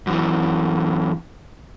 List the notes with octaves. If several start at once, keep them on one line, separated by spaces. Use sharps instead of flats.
F#2 E3